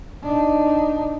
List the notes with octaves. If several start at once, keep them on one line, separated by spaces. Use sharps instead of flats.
D4 D#4